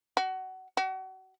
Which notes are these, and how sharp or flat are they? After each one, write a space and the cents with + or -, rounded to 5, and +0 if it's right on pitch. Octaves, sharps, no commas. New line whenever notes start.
F#4 +20
F#4 +35